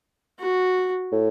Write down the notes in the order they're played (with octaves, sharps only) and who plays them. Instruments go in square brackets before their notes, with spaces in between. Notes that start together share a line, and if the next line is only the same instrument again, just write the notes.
[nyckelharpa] F#4
[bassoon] A2